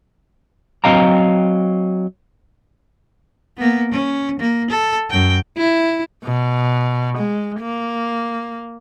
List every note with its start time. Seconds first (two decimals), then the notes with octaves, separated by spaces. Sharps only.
0.84 F#3 C4 D#5 F5 G5 A#5
3.57 A#3 B3
3.91 C#4
4.39 A#3
4.70 A4
5.10 F#2 G5
5.58 E4
6.24 B2
7.18 G#3
7.60 A#3